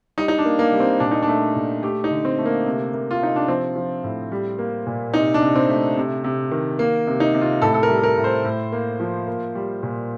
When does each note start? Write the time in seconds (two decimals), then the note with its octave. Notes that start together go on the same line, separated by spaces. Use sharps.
0.18 G3 D#4
0.28 D#4
0.38 D4
0.45 A#3
0.59 A#3
0.72 G3
0.80 C4
1.00 A#2 D4
1.11 D#4
1.22 A3 D4
1.56 A#2
1.83 A3 G4
2.04 D#4
2.11 D3
2.25 C4
2.38 A3
2.46 A#3
2.66 C3
2.94 A#3
3.11 F4
3.21 C3 D#4
3.36 D4
3.48 F3 C4
3.76 F3
4.04 A2
4.32 G3
4.59 A#3
4.86 A#2
5.13 C3 D#4
5.34 D4
5.41 C3
5.56 C4
5.69 A3
5.97 C3
6.24 C3
6.51 D#3
6.79 A#3
7.07 C3
7.20 D#4
7.34 C3
7.41 F4
7.62 A2 A4
7.74 A4
7.83 A#4
7.90 G3
8.03 A#4
8.17 A2
8.24 C5
8.44 A2
8.72 A#3
9.00 F3
9.28 A#3
9.55 G3
9.83 A#2